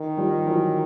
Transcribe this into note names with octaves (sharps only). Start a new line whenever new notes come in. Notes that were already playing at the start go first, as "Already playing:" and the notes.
Already playing: D#3
F3 G3
E3 F#3